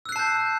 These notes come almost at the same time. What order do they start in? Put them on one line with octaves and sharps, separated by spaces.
E6 F#6 C7 A5 G6